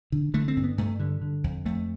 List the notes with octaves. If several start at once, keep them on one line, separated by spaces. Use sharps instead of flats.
D3
D3 A3
C4
G2
B3
G2 A3
D3 G3
D3
F2
F2 A3